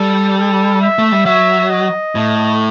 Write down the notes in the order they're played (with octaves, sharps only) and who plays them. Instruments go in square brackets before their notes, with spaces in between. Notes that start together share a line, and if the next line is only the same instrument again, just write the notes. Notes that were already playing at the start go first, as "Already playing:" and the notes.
Already playing: [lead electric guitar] G3 [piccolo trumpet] A4
[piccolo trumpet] A4
E5
[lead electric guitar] A3
G3
[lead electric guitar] F#3 [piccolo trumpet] E5
[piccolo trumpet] D#5
[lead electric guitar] A2